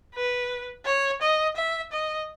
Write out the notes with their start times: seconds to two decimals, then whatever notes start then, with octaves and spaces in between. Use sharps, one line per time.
0.14 B4
0.86 C#5
1.21 D#5
1.56 E5
1.92 D#5